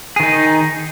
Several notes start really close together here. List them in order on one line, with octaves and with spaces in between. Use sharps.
G#4 D#3 D#4